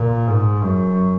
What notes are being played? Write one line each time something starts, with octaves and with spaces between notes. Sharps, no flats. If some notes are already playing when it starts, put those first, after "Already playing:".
Already playing: A#2
G#2
F#2